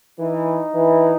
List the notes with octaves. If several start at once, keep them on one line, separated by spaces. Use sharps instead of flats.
E3 D#4
E3